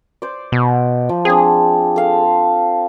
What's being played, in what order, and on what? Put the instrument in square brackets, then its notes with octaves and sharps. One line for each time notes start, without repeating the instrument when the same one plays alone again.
[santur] C5 D5
[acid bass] B2
[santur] F3
[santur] C4 D4 [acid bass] G#4
[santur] A4 F5